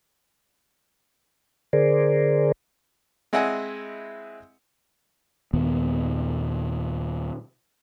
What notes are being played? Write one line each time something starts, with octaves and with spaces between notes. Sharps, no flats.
D3 G#4 A#4 C5 D5
G#3 C4 E4 D#5 F#5 G#5
D#2 A#2 D#3 B3